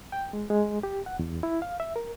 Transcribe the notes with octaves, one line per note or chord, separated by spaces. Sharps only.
G5
G#3
G#3
G4
F#5
E2
E4
F5
E5
A#4